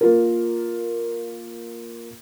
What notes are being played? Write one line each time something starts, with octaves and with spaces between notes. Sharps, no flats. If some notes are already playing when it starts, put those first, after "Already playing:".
A#3 F4 A#4